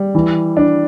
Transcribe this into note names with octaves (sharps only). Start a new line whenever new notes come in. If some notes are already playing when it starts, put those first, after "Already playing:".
Already playing: G3
E3
D4